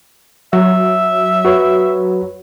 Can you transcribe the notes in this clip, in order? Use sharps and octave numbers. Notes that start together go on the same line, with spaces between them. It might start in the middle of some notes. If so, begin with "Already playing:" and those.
F#3 E5
F#4 B4 C#5